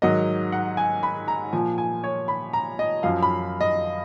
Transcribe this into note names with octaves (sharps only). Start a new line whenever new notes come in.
G#2 D#3 F#3 D#5
F#5
G#5
B5
A#5
A#2 F3 G#5
G#5
C#5
B5
A#5
D#5
F#2 F3 F5
B5
D#5